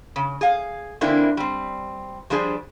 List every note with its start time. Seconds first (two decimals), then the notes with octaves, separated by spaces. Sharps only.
0.16 C#3
0.41 G#4 F5
1.01 D3 E3 A#3 C4 D4 E4
1.37 G3 C4
2.30 F3 G3 D4 G#4 C5